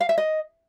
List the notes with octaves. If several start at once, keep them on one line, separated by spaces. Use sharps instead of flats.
F5
E5
D#5